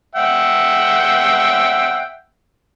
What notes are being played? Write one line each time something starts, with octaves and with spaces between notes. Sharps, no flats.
E5 F#5 G5